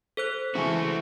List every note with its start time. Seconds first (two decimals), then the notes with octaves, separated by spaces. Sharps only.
0.17 A4 C5 F#6
0.55 C#3 E3 G#3 A3 F#4 G#5